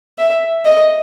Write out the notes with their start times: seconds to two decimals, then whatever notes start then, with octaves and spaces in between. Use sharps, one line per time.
0.18 E5
0.65 D#5